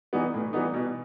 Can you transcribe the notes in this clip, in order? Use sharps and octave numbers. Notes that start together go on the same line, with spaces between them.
E3 G3 B3 D#4
A2
E3 G3 B3 D#4
B2